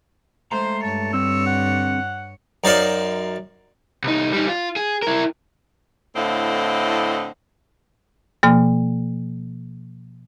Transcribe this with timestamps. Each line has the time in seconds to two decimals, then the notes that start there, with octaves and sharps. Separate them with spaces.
0.52 G#3 A3 C5 A#5 C6
0.82 G2 C#5 A5
1.13 D3 G3 C4 E6
1.46 F#5
2.64 F#2 D#4 C5 D5 F5
4.04 C2 D#4
4.33 G3 D#4
4.48 F4
4.76 G#4
5.02 E4 A#4
6.16 A2 D3 C4 E4 D#5 F5
8.43 B2 F3 A#3